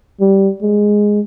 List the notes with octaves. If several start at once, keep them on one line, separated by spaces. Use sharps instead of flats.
G3
G#3